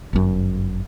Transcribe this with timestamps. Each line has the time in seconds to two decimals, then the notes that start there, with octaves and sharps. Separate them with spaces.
0.13 G1 F#2